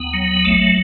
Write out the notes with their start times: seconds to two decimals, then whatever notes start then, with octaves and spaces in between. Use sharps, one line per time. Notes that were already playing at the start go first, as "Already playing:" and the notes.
Already playing: D#2 B3
0.14 F#3
0.45 A1 A3